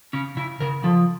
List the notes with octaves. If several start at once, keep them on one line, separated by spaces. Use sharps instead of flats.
C#3 C#4
C#3 E4
C#3 A#4
F3 A4